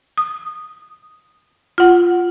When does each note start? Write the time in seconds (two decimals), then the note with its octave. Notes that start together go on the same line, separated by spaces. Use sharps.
0.18 D#6
1.78 F4 F#5